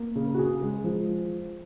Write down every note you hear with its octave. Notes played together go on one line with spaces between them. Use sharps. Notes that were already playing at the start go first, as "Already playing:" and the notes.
Already playing: A#3
C#3
F#4
C#3 G#4
G#3
F3